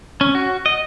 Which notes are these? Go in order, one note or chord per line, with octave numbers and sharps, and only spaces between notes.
C#4
F#4
D#5